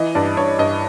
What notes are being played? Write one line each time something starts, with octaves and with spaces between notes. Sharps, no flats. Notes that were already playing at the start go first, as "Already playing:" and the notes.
Already playing: E3 D#5
G2 D5
G2 C#5
G2 D#5